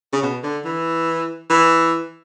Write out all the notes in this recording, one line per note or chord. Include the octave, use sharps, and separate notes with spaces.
C#3
B2
D3
E3
E3